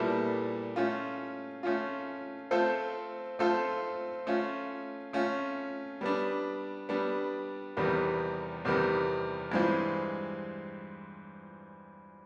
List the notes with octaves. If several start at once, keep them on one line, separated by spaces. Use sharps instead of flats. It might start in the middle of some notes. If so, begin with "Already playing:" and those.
Already playing: A#2 G3 B3 E4 A4
A3 C#4 F4
A3 C#4 F4
A3 C4 F4 A4 C5
A3 C4 F4 A4 C5
A3 C#4 F4
A3 C#4 F4
G3 B3 D4
G3 B3 D4
E2 C3 D#3 G3 B3
E2 C3 D#3 G3 B3
G2 E3 G#3 C4 F4